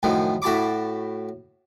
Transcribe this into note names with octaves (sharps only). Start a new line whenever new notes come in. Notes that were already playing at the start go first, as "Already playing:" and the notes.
F#2 A2 D#3 F3
A2 F#4 A5 B5 D6